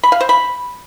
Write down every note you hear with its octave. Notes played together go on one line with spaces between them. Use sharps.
B5
F5
C5
B5